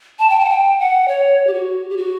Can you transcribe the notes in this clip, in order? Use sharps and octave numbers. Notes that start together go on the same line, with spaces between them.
A5
G5
A5
F#5
G5
F#5
C#5
G4
F#4
G4
F#4